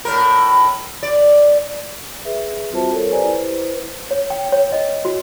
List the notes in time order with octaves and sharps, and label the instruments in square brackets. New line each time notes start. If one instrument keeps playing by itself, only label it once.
[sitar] A2 A#4
D5
[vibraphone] G#4 B4 E5
G3 C4 F4 F#4 C5 A5
A4 A#4 C#5
G4 B4 C5 D5 G#5 A#5
E4 B4 C5
[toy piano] C#5
G5
C#5
D#5
F#4